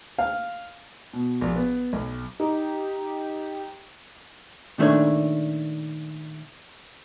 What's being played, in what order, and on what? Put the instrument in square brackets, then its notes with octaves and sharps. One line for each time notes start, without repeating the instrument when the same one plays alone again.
[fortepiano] F5
[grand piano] B2
A#1
B3
B1
[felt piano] D#4 [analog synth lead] G4
[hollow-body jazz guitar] A#2 D#3 A3 A#3 D4 C#5